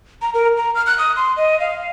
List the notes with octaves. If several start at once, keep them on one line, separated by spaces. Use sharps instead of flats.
A#5
A#4
A#5
F6
F#6
D#6
C6
D#5
F5